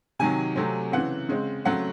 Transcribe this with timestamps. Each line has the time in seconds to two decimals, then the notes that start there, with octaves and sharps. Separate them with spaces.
0.19 C3 D#3 F#3 G#5
0.56 C3 F#3 A3 C4
0.92 C#3 E3 C4 F#5
1.29 C#3 G#3 C4
1.65 C#3 F#3 A3 C4 F#5